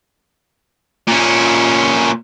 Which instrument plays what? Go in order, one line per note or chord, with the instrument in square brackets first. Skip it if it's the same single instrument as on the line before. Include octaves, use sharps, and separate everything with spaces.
[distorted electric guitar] A#2 C#4